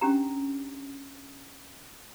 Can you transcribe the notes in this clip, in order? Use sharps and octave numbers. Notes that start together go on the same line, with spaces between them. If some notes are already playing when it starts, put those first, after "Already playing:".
C#4 D4 G4 A#5